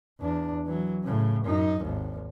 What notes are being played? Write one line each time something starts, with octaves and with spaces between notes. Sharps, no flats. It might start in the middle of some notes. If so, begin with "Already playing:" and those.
E2 D4
E3 F#3
A2 C#3
F#2 D#4
G#1 D#2